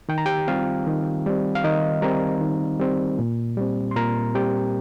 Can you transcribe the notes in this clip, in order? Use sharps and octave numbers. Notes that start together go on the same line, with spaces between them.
D#3 G5
A#5
G4 G5
G3 C4 F4 F5
D#3
G3 C4
F5
D#3 D#4 D#5
G3 C4 A#4 A#5
D#3
G3 C4
A#2
G3 C4
C6
A#2 A#4 A#5
G3 C4 G4 G5